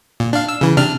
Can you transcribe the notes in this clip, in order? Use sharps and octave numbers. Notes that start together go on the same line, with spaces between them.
A#2
D4 F5
E6
C#3 E3
C3 D4 F6